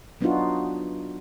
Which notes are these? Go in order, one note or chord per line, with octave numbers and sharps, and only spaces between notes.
F#3 B3 D4 D#4 F4 F#4